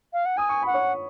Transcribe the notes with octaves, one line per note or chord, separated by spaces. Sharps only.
F5
F#5
G#5 D#6
C#6
F#5 B5
C#5 C#6